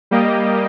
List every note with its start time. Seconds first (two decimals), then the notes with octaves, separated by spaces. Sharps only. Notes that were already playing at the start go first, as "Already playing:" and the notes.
0.11 G3 A#3 G4 D#5